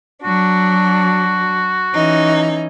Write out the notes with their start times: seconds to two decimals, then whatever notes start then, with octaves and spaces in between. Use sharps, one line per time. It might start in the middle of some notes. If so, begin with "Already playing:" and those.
0.24 F#3 D4 F#4
1.95 E3 C#4 D#4